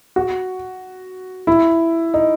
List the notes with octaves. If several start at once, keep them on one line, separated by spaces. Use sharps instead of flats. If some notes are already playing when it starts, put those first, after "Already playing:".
F#4
E4
D#4